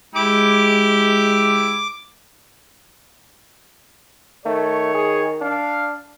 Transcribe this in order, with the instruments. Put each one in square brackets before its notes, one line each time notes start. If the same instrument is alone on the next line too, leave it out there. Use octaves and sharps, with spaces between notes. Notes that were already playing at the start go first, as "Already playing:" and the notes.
[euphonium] G#3 [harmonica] E4 G4 [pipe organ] D6
[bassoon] D#3 [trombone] A3 [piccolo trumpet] C#5
[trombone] G#4
[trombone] D4 [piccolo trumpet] F5